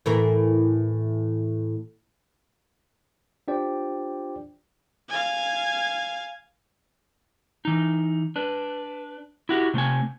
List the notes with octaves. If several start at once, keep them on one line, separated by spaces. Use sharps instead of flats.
A2 E3 A#4
D4 F4 G4 C5 D5 G5
F5 G#5
E3 D#4
D4 B4
E4 F#4 G4
C3 A3 C4 G#5